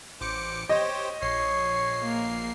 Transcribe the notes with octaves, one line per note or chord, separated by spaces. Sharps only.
A1 C5 D6 C#7
G4 C5 C#5 D#5
A#1 C#5 C7
A#3